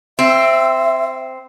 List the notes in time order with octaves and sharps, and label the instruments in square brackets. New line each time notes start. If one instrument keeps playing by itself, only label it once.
[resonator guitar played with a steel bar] C4 [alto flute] E5